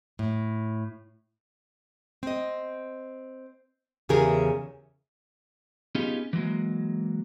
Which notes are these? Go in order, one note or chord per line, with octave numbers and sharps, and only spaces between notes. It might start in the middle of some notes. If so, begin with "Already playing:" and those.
A2
C4 D#5
E2 C#3 E3 G4 G#4 A#4
B3 C#4 D#4 F4 G4 G#4
E3 F#3 G#3 A#3